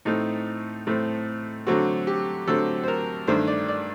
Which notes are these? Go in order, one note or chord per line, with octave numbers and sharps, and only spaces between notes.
A2 A3 C4 D#4
A2 A3 C4
D3 F#3 A3 C4 F#4
G4
D3 F#3 A3 C4 A4
C5
A#4
G2 D#3 A3 D4 C5
D5
D5